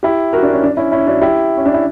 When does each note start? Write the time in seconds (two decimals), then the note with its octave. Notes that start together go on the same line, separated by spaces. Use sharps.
0.03 E4 G4
0.33 F#4 A#4
0.43 D4
0.53 C#4
0.63 D4
0.77 C#4 E4
0.92 C#4 E4
1.07 D4 F#4
1.22 E4 G4
1.57 C#4
1.66 D4
1.74 E4